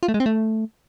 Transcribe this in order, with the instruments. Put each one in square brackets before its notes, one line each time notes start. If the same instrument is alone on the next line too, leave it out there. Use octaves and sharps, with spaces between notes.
[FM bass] F4
A3
G#3
C4
A3